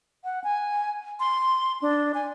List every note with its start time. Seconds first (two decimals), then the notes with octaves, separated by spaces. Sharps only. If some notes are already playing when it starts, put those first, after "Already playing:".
0.24 F#5
0.44 G#5
1.20 C6
1.82 D4
2.14 G#5